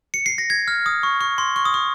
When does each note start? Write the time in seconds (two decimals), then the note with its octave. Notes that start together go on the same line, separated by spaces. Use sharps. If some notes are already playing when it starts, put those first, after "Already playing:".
0.14 C#7
0.26 C7
0.38 A#6
0.50 G#6
0.68 F6
0.86 D#6
1.03 C#6
1.21 C#6
1.38 C6
1.56 C#6
1.65 D#6
1.74 C#6